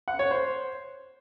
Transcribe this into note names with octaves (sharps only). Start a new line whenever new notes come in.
F#5
C#5
C5